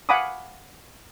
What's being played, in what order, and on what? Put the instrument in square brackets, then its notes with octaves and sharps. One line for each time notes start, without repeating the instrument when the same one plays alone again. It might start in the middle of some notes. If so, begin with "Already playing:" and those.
[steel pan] F5 F#5 G#5 B5 D6 D#6